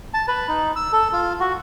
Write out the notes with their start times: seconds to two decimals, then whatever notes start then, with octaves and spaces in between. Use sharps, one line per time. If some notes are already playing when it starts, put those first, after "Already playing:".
0.14 A5
0.28 B4
0.48 D#4
0.76 E6
0.93 A4
1.13 F4
1.40 F#4